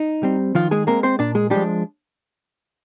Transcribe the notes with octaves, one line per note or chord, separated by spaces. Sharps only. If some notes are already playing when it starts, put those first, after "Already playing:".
Already playing: D#4
G3 C4
D#3 F3 F4
G#3 G#4
G#3 A#3 C4 A#4
C4 C5
A#2 D4 D5
G#3 G#4
F3 G3 G#3 D4 G4